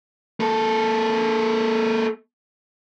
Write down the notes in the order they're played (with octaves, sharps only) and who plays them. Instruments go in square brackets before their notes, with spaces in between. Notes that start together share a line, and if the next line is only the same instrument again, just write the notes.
[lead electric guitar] A#3 A4